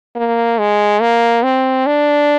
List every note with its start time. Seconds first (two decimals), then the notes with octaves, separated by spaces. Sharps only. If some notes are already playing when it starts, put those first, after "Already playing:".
0.16 A#3
0.59 G#3
1.01 A#3
1.43 C4
1.86 D4